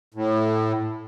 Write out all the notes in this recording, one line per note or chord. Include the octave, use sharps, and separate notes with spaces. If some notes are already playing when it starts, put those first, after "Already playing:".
A2